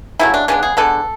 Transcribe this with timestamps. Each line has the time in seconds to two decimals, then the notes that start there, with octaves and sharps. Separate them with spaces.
0.19 C#3 F#3 A3 E4
0.34 D4
0.48 C#3 G#3 B3 D4
0.63 G#4
0.77 D3 G#3 B3 A4